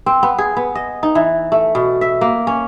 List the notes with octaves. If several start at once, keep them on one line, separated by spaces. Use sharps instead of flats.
C4
B3
G#4
B3
D#5
D#4
E3
A3
B2
E5
A#3
C#4